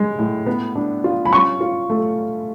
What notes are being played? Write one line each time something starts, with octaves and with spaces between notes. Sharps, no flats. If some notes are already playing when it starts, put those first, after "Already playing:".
Already playing: G#3
A2
B3
D4
F4
B5
C#4 C#6
F4
A3